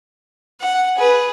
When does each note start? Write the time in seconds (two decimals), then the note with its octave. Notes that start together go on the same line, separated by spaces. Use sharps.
0.61 F#5
0.97 G#4 B4